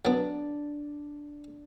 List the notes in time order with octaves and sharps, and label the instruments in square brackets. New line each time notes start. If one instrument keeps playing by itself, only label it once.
[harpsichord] F#3 B3 [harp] D4 D5